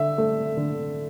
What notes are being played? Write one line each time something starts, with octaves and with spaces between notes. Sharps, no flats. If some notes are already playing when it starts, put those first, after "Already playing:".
Already playing: D3 E5
A3
D3